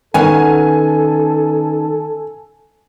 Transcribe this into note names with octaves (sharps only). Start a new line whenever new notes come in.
D#3 B3 C#4 A4 G#5